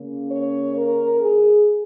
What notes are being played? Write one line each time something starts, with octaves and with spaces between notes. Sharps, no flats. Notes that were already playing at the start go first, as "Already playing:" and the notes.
Already playing: C#3 A#3 C#4
C#5
A#4
G#4